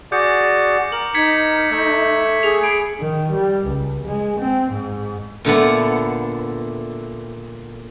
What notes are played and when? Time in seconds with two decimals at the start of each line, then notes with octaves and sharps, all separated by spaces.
0.12 F#4 G#4 D5 D6 G6 C#7
0.92 A#4 F#7
1.14 D#4 G#6 B6 C#7
1.71 A3 E5
2.43 G#4 F7
2.64 B5 D7
3.00 D#3
3.32 G3
3.65 C#2
4.05 G#3
4.40 C4
4.71 G#2
5.45 A#2 D3 A3 B3